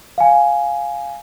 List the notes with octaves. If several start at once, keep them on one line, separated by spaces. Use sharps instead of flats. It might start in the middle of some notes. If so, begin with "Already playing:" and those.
F5 G#5